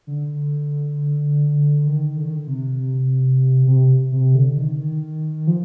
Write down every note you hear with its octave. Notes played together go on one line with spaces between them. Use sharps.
D3
D#3
D3
D#3
D3
C3
C3
C3
D3
D#3
F3